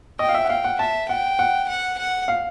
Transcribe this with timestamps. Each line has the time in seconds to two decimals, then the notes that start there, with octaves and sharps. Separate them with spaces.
0.19 D#5 G5
0.29 F5
0.34 E5
0.45 F#5
0.49 F5 G5
0.64 F#5
0.79 E5 A5
1.09 F#5 G5
1.39 F#5
1.68 F#5
1.98 F#5
2.28 F5